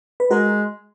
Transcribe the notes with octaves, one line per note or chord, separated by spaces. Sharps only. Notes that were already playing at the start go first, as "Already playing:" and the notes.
B4
G#3 F#4 A#4